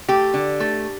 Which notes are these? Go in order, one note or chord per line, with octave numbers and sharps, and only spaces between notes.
A3 G4
D3
A3